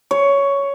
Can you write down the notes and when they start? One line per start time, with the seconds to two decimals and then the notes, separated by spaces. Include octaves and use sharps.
0.11 C#5